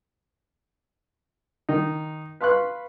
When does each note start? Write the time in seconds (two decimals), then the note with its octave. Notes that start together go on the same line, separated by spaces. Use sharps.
1.69 D#3 D#4
2.41 B4 F5 C6 C#6 F#6